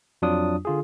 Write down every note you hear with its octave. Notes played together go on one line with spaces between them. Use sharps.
F2 F#3 D4 F4 D#6
D3 F4 G#4